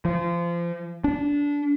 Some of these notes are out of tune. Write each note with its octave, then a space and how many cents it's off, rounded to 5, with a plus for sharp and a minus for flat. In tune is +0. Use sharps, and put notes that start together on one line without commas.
F3 -30
D4 -20